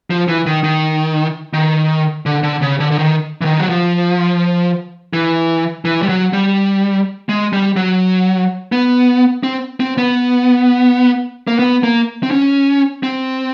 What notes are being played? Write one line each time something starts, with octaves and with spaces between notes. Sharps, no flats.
F3
E3
D#3
D#3
D#3
D3
D3
C#3
D3
D3
D#3
E3
D#3
F#3
F3
E3
E3
G3
F#3
G3
G#3
G3
F#3
B3
C4
C4
B3
A#3
B3
A#3
C4
C#4
C4